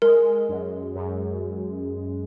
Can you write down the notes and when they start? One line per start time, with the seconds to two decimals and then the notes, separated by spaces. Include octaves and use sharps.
0.02 G#3 A#4
0.49 F#2
0.95 F#2